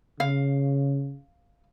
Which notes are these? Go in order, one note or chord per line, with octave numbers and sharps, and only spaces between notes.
C#3 F5